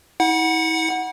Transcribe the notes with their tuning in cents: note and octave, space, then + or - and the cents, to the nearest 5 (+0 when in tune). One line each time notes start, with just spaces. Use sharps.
E4 -40 F#5 +0